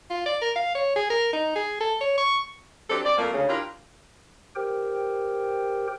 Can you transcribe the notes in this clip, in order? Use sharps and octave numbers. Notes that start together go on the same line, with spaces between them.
F4
D5
A#4
F5
C#5
G#4
A#4
D#4
G#4
A4
C#5
C#6
F#3 C4 D4 G4 A4
C4 D5
F2 A3 A#3
D2 C#3
D4 E4 F4 G4 A#4
G4 A#4 C5 G5